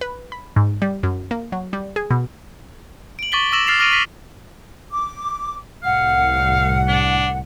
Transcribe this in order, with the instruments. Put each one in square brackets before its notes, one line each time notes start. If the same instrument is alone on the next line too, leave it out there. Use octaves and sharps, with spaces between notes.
[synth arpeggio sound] B4
B5
G#2
G3
F#2
A#3
F#3
G3
G#4
B2
[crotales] D7 F#7
C#6 D6 A6 B6 F#7 G7
C#6 D6 E6 A#6 E7 F#7
F6 A6 C7 E7 F7
D6 F6 A#6 D7 D#7 F7
A#6 B6 D#7
[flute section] D6
[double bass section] C2 A2 [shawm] F5 [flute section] F#5
[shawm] D4